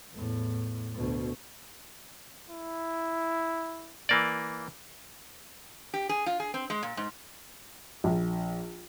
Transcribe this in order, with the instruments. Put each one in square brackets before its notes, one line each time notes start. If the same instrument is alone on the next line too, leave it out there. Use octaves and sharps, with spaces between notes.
[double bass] E2 A2
D2 B2
[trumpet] E4
[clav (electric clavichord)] E3 A#3 D5
[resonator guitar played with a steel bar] G4
G#4
F4
G#4
C4
G#3
A#2
G#2
[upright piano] A#1